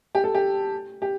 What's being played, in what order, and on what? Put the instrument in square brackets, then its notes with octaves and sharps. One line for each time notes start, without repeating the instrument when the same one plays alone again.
[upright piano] G4
A4
G4
G4